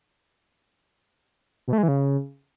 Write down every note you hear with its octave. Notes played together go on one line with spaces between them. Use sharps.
B2
A3
G#3
E3
C#3